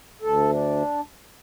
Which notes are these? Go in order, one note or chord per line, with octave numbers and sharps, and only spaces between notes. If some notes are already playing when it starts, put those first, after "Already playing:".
D2 A4
D4